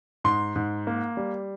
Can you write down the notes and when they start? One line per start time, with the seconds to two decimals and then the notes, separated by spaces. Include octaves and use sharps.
0.24 G#2 C6
0.56 G#2
0.87 A#3
1.17 G3